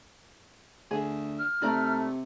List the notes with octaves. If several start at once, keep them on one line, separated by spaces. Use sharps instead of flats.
D2 G#4
F6
C3 A3 D#4 D5 A#5